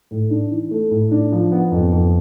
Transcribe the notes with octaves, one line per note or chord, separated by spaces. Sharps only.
A2
D4
E3
A3
A2
D4
F3
B3
F2
F2